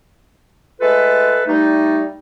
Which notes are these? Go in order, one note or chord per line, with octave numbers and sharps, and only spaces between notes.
G#3 A3 F4 A4 B4
G3 A3 D#4